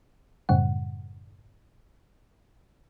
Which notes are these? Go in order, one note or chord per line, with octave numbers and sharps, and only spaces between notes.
F#2 A2 C#3 G3 F#5